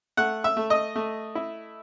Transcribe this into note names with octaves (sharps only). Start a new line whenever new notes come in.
A3 F#5
E5
A3
D#5
A3
E4